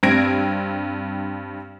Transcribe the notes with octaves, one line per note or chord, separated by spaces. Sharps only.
G2 C4 G#6 A#6 D7